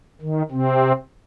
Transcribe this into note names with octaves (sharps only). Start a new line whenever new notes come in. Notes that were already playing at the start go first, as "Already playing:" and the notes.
D#3
C3 C4